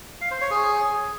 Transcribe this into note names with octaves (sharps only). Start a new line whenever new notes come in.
F5
C5
C#5
G#4